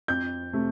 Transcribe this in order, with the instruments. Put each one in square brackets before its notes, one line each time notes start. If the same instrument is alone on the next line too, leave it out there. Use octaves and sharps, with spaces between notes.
[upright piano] F2 G6
C3 A3